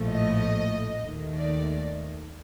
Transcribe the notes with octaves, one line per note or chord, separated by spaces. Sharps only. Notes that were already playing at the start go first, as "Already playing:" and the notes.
Already playing: A#1 A2 F3 A3
D#5
D#2 D#3 A3
D5